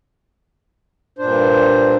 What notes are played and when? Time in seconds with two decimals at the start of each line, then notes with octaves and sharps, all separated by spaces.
1.19 G2 A#2 D4 C5